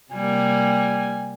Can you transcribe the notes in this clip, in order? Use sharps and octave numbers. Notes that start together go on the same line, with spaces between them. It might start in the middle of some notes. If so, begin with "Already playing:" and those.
C3 G3 A#3 G#5